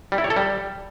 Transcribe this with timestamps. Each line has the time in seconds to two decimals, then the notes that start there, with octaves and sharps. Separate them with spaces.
0.12 G3
0.18 E4
0.24 C#5
0.30 A4
0.36 G3